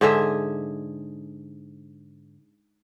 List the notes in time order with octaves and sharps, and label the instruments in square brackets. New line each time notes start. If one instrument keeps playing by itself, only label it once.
[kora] G#2 D3 G#4 E5